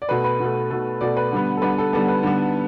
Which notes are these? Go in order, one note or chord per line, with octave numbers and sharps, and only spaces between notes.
D5
B2 A3 B4
B4
B2 A3
B2 A3
B2 A3 D5
B4
D3 G3 B3
A4
D3 G3 B3 B4
A4
D3 G3 B3 A4
B4
D3 G3 B3